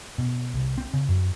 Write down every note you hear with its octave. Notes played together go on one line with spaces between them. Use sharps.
B2
C2
C4
C#3
F#2